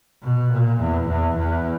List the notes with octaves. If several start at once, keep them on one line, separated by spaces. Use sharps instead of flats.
B2
A#2
E2
E2
E2